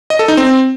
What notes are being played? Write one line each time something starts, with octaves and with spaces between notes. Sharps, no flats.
D#5
A4
D#4
C4